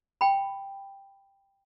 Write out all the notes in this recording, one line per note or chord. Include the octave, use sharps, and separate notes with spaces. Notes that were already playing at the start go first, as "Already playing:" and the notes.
G5 B5